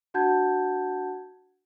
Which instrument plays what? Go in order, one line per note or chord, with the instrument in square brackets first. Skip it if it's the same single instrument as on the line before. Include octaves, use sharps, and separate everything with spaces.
[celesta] D4 F#4 F#5 A5 G6 G#6